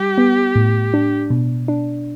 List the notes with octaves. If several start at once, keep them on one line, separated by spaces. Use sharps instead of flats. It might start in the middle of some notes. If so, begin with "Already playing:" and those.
Already playing: G3 G4
B3
A2
D4
B2
D4